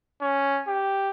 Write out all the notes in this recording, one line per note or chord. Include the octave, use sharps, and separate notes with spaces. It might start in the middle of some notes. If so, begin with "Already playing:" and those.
C#4
G4